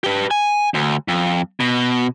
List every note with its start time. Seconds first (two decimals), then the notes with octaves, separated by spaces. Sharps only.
0.04 G4 B4
0.31 G#5
0.74 D2
1.08 F2
1.60 B2